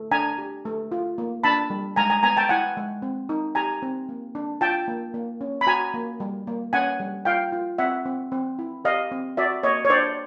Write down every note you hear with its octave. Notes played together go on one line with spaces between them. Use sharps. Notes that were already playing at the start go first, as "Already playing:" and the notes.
Already playing: A3
D4 G#5 A#5
G4
A3
F4
A#3
D4 A5 B5
G3
G#3 G#5 A#5
G#5 A#5
B3 G#5 A#5
G5 A5
E4 F#5 G#5
G#3
C4
D#4
G4 G#5 A#5
C4
A#3
D4
F4 G5 A5
A#3
A#3
C#4
B5
F#4 G#5 A#5
A#3
G3
A#3
C#4 F#5 G#5
G3
F4 F5 G5
F4
C4 E5 F#5
C4
C4
E4
G4 D#5 F5
C4
F#4 D5 E5
A#3 C#5 D#5
C#5
D4 C5 D5